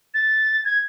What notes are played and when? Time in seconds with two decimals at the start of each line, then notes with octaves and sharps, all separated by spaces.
0.14 A6
0.65 G#6